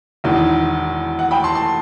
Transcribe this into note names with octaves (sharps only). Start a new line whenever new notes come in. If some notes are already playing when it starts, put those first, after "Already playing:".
E1 E2 D#3
F#5
G5 B5
A5 C6
A5 C6